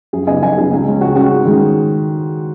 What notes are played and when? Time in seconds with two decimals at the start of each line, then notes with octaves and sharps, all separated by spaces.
0.13 F#2 G#4
0.27 C#3 B3 D#4 D#5 G#5
0.42 F#2 D#5 G#5
0.57 C#3 B3 D#4 G#4
0.72 C#2
0.86 C#3 G#3 C#4
1.01 C#2 F#4
1.16 C#3 G#3 C#4 F#4
1.31 G#2
1.45 D#3 G#3 C#4